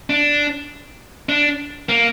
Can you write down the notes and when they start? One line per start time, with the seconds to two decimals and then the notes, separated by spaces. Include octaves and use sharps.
0.10 D4
1.29 D4
1.89 A#3